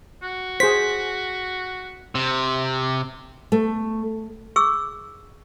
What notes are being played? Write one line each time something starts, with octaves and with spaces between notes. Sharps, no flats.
F#4
G#4 C5 B6
C3
A3
G#4 C#6 E6